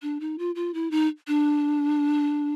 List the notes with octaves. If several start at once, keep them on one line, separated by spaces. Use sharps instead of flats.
D4
D#4
F4
F4
E4
D#4
D4